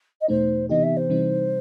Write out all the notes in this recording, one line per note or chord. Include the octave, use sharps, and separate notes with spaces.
D#5
E2 B2 A3 D#4 C5
C3 E3 B3 D#4 G4 D#5
E5
C5
C3 E3 G3 C4 D#4